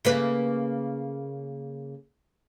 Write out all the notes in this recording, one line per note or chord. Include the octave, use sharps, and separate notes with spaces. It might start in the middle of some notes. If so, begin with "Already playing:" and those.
C#3 A#3 B4